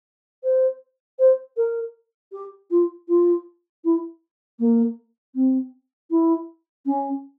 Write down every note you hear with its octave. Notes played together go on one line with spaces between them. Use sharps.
C5
C5
A#4
G4
F4
F4
E4
A#3
C4
E4
C#4